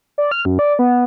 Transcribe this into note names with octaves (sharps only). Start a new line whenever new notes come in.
D5
F6
F#2
D5
B3